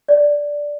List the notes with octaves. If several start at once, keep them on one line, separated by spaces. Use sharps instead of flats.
D5